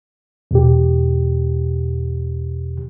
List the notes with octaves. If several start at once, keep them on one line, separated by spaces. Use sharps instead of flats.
E2 B2 G4